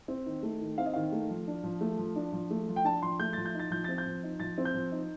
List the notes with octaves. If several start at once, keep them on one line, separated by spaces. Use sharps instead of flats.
C4
D#3
A3
D#3
C4 F5
D#5
D#3 F5
A3
F3
D4
F3
A3
F3
D4
F3
A3
F3
G5
D4 A5
F3 C6
A3 G6
F3 A6
G6
D#4 A6
F3 G6
C4 A6
G6
F3
D#4
F3 A6
C4
G6
F3
D#4